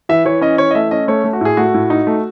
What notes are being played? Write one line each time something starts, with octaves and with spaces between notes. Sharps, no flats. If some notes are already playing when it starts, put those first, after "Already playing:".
E3 E5
E3 C#5
C#4 D#5
E3 C#5
D#5
A3 E5
C#4 D#5
A3 C#5
A3
F#4
A2 G#4
A3 F#4
A2
D#4
A3